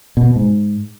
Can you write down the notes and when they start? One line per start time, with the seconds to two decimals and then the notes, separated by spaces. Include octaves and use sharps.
0.17 B2
0.36 G#2